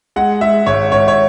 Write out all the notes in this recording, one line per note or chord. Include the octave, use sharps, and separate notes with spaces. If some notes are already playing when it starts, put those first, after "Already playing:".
G#3 F#5
G#3 E5
G#1 C#5
G#1 C#5
C#5